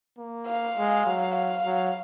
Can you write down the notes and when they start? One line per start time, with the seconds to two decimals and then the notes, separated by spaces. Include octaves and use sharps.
0.19 A#3
0.47 F5
0.77 G#3
1.06 F#3
1.36 F5
1.65 F#3